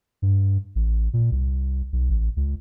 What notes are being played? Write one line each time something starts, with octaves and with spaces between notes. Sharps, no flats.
G2
A1
A#2
C2
B1
A1
C#2